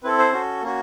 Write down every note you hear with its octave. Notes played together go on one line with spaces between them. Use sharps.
C4 E4 A4 B4
C5
C#4 F#4 A4
A#3 C#4 F#4